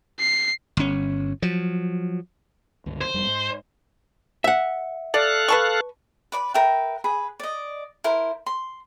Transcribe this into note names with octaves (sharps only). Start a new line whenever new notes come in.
C7
G1 C#4
F3 F#3
C#2 G2 D3
C5
E1 F2 G3
G#2
E5 F#5
A4 D5 F5 F#6
B4 A5 C#6
B4 D5 B5
A#4 B4 E5 G5
G#4 B4 B5
D5 D#5
E4 A#4 C5
C6